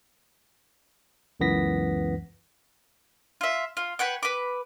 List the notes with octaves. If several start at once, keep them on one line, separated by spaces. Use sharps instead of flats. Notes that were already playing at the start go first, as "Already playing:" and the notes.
C#2 F#2 E3 B3 A#6 B6
F4 E5
F4
B4 C#5 F#5 G5
B4 D6